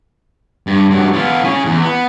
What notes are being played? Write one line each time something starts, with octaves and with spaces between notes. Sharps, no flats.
G2
G2 F#3
B3 F4
C#4 G#4
E2
B3